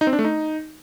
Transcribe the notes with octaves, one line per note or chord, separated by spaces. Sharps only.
D#4
C4
D4
A3
D#4